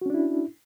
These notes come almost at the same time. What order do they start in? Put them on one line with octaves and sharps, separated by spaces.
F#4 C#4 D4 E4